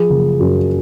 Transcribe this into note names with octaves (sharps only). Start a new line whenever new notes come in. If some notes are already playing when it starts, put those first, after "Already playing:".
Already playing: F3 G#4
F#1
F#2